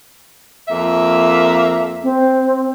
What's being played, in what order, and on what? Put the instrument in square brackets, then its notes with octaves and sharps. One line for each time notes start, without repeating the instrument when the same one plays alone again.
[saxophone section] F2 A#3 E5
[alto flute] C4